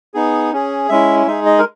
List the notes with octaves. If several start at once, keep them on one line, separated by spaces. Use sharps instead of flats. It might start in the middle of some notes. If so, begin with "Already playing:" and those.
B3 D#4 G#4
C#4 G#4
G#3 C#4 E4 E5
G#3 D#4 G#4 E5
D#5
A#4